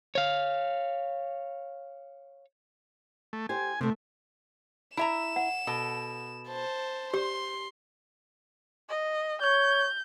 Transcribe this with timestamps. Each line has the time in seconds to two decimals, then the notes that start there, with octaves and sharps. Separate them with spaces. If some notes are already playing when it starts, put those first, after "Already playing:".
0.15 C#5 F5
3.33 A3
3.49 G4 C5 G#5
3.81 C3 A3 B3
4.97 E4 E5 A#5 E7
5.36 F#5
5.67 B2 A4
6.48 C5 A5
7.14 G4 C5 C6
8.89 D#5
9.42 C#5 G6